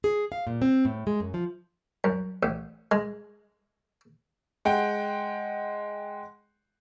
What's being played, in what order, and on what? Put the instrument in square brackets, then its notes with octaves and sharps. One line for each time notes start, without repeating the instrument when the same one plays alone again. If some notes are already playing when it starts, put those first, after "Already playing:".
[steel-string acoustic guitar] G#4
F5
A#2
C4
A2
G#3
F#2
F3
[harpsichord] F#2
A1
G#3
[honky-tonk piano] G#3 F#5 G5